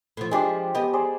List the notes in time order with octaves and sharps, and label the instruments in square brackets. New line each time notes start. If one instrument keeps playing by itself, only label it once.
[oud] A2 F3
[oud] F3 D4 [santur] G#3 G4 D6
[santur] B3 [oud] G4 D#5
[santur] G#4 C5 D5